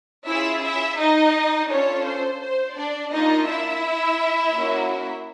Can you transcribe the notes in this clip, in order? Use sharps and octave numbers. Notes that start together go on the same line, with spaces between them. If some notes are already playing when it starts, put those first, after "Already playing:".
C#4 E4 F4 G#4 E5
E4 E5
D#4 D#5
C#4 D4 F4 A4 C#5
C5
C5
D4 D5
A#3 D4 D#4 F4 D#5
E4 E5
A#3 C#4 F#4